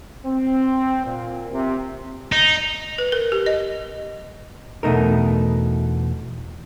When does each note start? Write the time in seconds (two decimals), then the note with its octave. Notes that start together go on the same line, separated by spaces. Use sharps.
0.25 C4
1.05 A#2
1.52 C3
2.32 D#4
2.98 B4
3.12 A#4
3.32 G4
3.46 D#5
4.83 E2 B2 A3 D#4 A#4